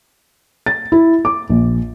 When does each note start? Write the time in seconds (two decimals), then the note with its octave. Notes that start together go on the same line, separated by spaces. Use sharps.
0.66 A6
0.92 E4
1.25 D6
1.49 A#1